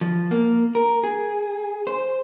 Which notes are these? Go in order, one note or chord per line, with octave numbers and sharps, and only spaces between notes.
F3
A#3
A#4
G#4
C5